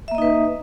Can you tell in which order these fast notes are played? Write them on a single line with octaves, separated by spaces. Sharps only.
E5 A#3 D#5 D#4 B4